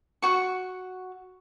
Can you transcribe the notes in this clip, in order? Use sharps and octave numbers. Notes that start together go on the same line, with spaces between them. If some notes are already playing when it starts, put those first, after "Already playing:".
F#4 C#6